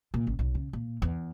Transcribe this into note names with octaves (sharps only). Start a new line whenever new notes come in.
A#2
A1
B1
C#3
A#2
E2